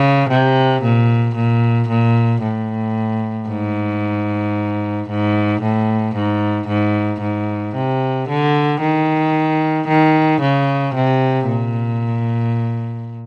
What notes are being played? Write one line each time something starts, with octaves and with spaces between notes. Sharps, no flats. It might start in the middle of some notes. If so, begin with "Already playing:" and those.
Already playing: C#3
C3
A#2
A#2
A#2
A2
G#2
G#2
A2
G#2
G#2
G#2
C3
D3
D#3
D#3
C#3
C3
A#2